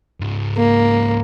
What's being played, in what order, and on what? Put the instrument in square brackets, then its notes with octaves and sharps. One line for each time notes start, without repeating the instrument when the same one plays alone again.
[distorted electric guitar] C#2 G#2
[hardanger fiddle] A#3